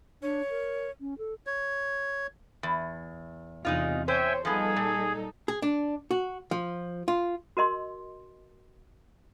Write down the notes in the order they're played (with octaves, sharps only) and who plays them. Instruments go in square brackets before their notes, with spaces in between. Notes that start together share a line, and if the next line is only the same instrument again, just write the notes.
[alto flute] D4 [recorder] C#5
[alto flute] A#4
C#4
A4
[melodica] C#5
[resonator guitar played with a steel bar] E2
[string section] E2 C3 [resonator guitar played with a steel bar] G#3 D#4 F4
[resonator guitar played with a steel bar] C5 [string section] C#5 [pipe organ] E5 G5 G#5
[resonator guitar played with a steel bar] F3 B3 [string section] G3 D#4 A4 [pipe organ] G#4
[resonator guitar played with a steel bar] A#2
[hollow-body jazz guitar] G#4
D4
F#4
F3
F4
[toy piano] F#4 A#4 D#5 C6